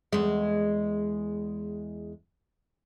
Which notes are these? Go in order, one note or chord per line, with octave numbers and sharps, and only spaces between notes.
E2 G#3